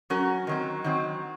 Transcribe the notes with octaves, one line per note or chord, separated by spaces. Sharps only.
F#3 C#4 F#4 A#4
D#3 F#3 C4
D#3 F#3 C4